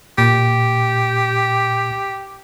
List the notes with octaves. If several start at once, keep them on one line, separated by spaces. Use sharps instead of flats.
A#2 G4